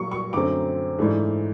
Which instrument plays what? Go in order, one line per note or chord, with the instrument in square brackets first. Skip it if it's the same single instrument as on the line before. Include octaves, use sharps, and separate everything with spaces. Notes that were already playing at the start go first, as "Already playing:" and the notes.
Already playing: [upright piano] A#2 F#3 A#3 C#6
C#6
F#2 D3 F#3 A3 C4 D6
G#2 E3 A3 D4